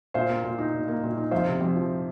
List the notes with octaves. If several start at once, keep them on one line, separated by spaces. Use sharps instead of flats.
A#2 C5 F5
A#3
A#2
D#4
A#2
A#3
A#2
D#4
F2 C5 F5
C3
F2
F3